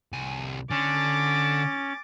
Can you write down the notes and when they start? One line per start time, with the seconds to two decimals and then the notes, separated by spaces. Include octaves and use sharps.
0.13 C2 G#5
0.71 D3 C#4 D6 A6